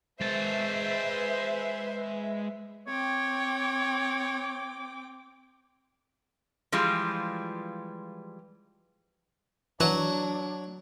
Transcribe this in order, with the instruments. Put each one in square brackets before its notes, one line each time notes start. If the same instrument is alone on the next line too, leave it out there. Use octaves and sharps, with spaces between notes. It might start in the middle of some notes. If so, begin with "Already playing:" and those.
[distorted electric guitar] G#3 A5 [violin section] B4 E5 [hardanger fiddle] C5
[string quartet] C4 G5 D6 [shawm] C#5
[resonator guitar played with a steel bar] E3 F3 G3 G#3 F4
[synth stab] E3 [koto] F#3 [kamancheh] D4 [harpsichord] C#5 F#5 A#5